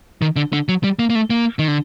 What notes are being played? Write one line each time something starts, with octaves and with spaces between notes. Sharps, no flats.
D#3
D3
D3
F#3
G3
A#3
A#3
A3
A#3
D#3
D3